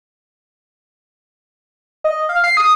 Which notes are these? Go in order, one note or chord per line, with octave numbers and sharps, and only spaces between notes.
D#5
F5
C7
D#6